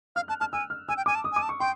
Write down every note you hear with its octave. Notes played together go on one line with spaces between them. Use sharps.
F5 F6
A5 F#6
A5 F6
G#5 E6
F6
G#5 E6
G5
G#5 D6
A5
D#6
G#5 D6
A5
C#6
G5 C6